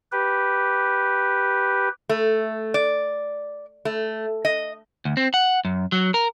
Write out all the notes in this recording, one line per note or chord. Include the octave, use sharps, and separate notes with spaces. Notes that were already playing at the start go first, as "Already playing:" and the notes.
G4 B4
A3
D5
A3
D#5
D2
C4
F#5
F#2
F#3
A#4